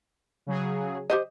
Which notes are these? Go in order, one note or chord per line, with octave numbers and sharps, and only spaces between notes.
C#3 F#3 G#4
G4 C5 D#5